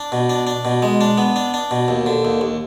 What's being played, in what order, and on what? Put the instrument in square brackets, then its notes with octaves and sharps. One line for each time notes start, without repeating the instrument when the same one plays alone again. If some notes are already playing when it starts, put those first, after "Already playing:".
Already playing: [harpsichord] D4
B2
D4
D4
B2
G#3
D4
B3
D4
D4
B2
D#2
D3
D#2
D#2